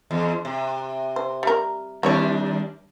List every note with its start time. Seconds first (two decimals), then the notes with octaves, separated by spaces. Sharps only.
0.11 E2
0.45 C3
1.16 C5
1.43 G3 A#4
2.03 D#2 G3 C4 D4 E4 C#5